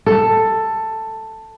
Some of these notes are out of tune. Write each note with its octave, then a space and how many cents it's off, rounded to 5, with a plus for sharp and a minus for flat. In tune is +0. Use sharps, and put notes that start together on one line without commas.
A4 +10